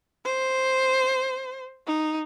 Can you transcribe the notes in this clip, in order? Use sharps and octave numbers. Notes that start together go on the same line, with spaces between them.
C5
D#4